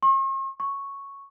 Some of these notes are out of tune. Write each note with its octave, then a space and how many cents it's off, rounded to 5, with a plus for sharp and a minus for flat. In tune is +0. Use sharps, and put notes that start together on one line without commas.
C#6 -45
C#6 +0